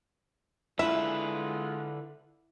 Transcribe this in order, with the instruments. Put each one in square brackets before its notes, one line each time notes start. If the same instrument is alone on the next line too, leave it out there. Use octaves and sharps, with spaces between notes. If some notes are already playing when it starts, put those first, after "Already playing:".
[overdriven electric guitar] D3 B4 [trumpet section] G#3 F4 [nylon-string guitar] E4 [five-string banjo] E5